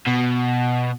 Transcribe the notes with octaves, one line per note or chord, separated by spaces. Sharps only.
B2